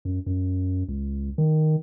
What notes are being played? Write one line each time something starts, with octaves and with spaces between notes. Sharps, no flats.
F#2
F#2
C#2
D#3